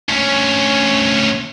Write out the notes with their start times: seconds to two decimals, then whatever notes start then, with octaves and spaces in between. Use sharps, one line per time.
0.09 D2 C#4